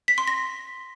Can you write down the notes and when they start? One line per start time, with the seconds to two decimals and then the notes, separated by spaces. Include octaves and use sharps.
0.08 B6
0.18 C6
0.28 A#6